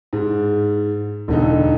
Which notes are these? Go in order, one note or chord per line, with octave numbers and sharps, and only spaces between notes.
G#2
E1 D3 D#4